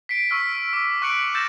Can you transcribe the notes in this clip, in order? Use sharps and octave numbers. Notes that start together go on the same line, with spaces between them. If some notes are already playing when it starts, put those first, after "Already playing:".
B6 C7 D7
C#6 E6 F6 B6
D6 E6
C#6 F#6 B6 C#7 D7 F#7
E6 G6 A6 A#6 E7